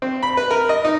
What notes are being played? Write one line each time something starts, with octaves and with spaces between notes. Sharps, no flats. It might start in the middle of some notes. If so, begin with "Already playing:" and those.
C4
B5
B4
A#4
D#5
D#4